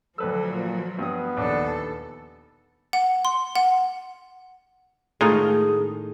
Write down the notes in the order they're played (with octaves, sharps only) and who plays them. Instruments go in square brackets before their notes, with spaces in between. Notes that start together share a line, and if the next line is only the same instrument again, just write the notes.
[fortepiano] D2 B4 E6 [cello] F3 F#3 [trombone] A4
[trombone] A#2
[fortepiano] G2 D#6 [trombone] B3
[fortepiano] A#1 D4 [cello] D#2 A4
[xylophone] F#5
C6
F#5
[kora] A2 D#3 [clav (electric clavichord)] G#3 D#4 F4 [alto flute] G#4